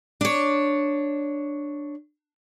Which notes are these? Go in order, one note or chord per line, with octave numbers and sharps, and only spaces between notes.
D4 C#5